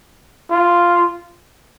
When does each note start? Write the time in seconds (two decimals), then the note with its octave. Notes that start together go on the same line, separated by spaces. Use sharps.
0.50 F4